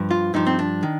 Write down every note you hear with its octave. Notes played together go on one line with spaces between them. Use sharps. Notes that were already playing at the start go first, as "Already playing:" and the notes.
Already playing: G2 F3
F4
G2 F3 D#4
C4
D4
D#3